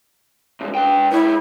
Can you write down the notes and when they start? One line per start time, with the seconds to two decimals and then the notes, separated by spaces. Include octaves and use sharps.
0.61 C2 G#2
0.75 B4 G5
1.11 G#2 E4 C#5